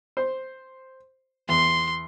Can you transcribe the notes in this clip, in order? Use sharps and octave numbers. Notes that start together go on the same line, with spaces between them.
C5
E2 C6